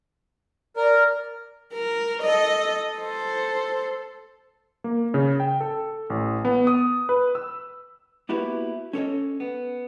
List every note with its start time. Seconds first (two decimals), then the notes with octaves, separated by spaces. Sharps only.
0.77 A#4 D5
1.73 A#4
2.23 A4 D#5
2.99 A4 C5
4.84 A#3
5.14 C#3
5.40 G5
5.61 A4
6.10 A1
6.45 B3
6.67 D#6
7.09 B4
7.35 E6
8.29 A#3 B3 E4 F#4 G4 B4
8.93 C#4 A4 C#5 D#5
9.40 B3